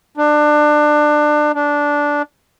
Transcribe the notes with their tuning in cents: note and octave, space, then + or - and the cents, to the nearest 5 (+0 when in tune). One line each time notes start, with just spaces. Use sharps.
D4 +25
D4 -10